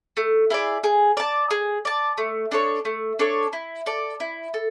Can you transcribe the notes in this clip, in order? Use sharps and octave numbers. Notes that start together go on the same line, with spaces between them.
A3
E4 G#4 D5
G#4
D5 A5
G#4
D5 A5
A3
D4 A4 C#5
A3
D4 A4 C#5
E4
A4 D5
E4
A4